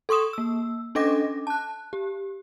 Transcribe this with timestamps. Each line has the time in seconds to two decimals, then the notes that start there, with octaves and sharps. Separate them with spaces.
0.09 A4 C6 C#6 D#6 E7
0.33 A#3 E6
0.95 C#4 D4 A4 D#5 D6 A#6
1.47 A5 F#6
1.93 G4